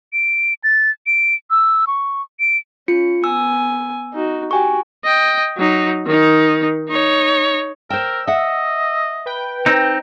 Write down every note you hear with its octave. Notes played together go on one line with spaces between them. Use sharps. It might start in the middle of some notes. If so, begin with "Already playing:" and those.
D7
A6
D7
E6
C#6
D7
C#4 F4 C#7
B3 G#5 E6
D#4 F#4
F#4 G4 G5 G#5 C#6
D#5 G5
F#3 D#4
D#3 D#4
D#4 C#5
A#4 C5 G5 E6
D#5 E5 F#5
B4 G5
C4 D#4